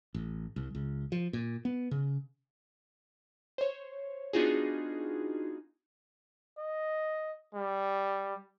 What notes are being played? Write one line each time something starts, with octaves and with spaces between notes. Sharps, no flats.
A1
C2
C#2
F3
A#2
B3
C#3
C5 C#5
B3 D4 D#4 F4 F#4 G#4
D#5
G3